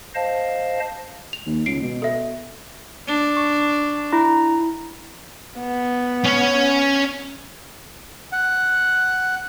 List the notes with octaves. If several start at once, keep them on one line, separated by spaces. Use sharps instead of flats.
C5 D#5 F5 A5
F7
D#2
C#2 C7 D7
B2
A4 E5
D4
C#6
E4 A#5
B3
C#4 C#5
F#5